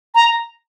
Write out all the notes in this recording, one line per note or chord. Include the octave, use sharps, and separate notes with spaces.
A#5